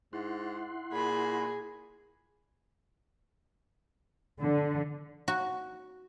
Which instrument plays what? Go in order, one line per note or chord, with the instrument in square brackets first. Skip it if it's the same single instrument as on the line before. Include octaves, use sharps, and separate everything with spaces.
[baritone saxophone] G#2 [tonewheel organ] E4 F#5 C6
[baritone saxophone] A#2 [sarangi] G#4 [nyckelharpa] B5
[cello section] D3
[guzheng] F#4